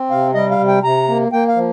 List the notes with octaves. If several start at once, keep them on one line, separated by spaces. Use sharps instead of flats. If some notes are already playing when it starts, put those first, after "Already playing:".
Already playing: C4
C3 F5
G3 D#5
F5
C3
G5
C3 A#5
A#3
A#3 G5
F5
F3